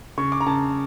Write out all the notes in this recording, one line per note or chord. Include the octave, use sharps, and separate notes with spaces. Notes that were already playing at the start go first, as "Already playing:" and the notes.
C#3 C#6
D6
A#5
C#3 A5